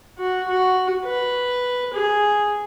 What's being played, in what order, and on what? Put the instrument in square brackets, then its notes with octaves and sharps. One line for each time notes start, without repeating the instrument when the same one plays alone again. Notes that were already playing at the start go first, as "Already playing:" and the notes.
[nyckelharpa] F#4
F#4
B4
G#4